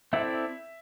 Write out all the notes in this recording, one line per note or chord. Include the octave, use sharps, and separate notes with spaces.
C4 E4 A4 D5 E5